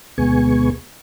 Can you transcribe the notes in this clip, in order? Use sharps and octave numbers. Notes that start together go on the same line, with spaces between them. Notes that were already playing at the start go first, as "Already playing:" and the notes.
D2 B2 G#3 B3 G#5 C#6